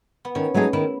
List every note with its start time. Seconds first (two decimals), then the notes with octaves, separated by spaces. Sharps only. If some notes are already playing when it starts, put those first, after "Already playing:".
0.25 B3
0.35 D#3 C#4
0.54 F#3 A3 D#4 G#4
0.73 D#3 E4